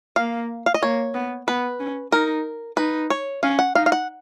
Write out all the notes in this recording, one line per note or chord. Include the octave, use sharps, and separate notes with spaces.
A#3 F5
F5
D#5
A#3 C#5
B3
B3 B4
C#4
D#4 A#4
D#4 B4
C#5
C#4 F5
F#5
D#4 F5
F5
F#5